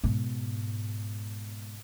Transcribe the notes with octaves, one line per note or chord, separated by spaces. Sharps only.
G#2 B2